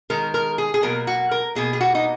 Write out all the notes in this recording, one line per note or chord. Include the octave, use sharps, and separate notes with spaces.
D#3 G#3 A#4
A#4
G#4
G#4
B2 F#3 A#3 A#4
F#4
A#4
B2 A#3 G#4
G#4
F#4
D#4